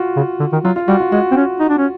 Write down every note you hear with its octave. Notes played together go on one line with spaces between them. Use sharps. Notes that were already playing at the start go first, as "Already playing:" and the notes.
Already playing: F4 F#4
C#3
D3
D#3
F#3 F4
F4
G3 F#4
F4
G#3 F#4
C4
C#4
D#4
D4
C#4